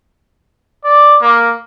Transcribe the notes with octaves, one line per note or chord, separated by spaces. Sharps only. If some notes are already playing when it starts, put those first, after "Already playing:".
D5
A#3